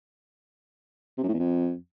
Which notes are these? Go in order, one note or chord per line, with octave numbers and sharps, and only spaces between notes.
C3
F#2
A2
E2
F2